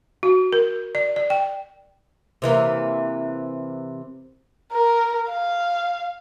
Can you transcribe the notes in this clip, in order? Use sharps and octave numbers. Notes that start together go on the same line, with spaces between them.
F#4
A#4
D5
D5
G5
C3 E3 A#3
A#4
F5